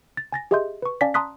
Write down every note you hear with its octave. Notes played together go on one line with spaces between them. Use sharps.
A6
G#5 A6 A#6
G4 G#4 D#5 E5 C6 G6
B4 C#6
C#4 D5 F5 G#5 A5 B6
A5 A#5 C6 D#6 F#6 B6